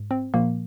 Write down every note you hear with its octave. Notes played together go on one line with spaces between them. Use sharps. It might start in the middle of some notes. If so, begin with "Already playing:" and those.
Already playing: G#2
C4
A#2 F3 A#3